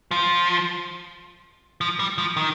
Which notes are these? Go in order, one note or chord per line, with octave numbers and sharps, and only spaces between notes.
F3
F3
G3
F3
D#3